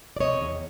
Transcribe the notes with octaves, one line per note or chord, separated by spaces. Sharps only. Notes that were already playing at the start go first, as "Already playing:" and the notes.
D5
C3 C#5 D#5
E2